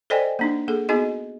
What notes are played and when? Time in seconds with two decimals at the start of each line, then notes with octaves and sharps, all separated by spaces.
0.10 A4 C5 D5 D#5 G5 G#5
0.39 A#3 D4 D#4
0.68 A#3 G#4 A4
0.89 B3 D#4 F#4 G#4 D#5